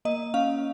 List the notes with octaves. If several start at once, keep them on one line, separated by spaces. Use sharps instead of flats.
A#3 D#5
C#4 F5